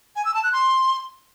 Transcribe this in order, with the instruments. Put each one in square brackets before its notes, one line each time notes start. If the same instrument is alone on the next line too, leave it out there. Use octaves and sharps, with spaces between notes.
[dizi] G#5
E6
A5
F#6
C6